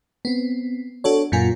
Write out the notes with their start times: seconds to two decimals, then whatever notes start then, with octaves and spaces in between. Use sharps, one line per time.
0.25 B3 C4
1.04 D4 F#4 A4 C#5
1.32 F#2 A#2 A#3 F4 G#5